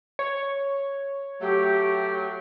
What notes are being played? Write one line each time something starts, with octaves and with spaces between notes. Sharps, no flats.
C#5
F#3 A3 G4